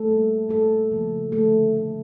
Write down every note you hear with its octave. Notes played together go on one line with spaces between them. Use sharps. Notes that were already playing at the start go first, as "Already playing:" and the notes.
Already playing: A3 A4
A#2 G3 A#3
A#2 A3 A4
C#3 F3 A#3
D3 F3 A3 A4
A#2 A3